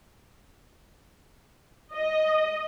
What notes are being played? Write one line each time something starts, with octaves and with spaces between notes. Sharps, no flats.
D#5